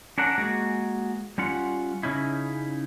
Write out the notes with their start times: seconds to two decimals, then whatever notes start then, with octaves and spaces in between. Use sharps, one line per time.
0.18 C#4 D4 A#4 F#5
0.38 G#3 A#3 F#4 G#4
1.38 G3 C#4 F4 F#5
2.03 C#3 C#4 D#4 E4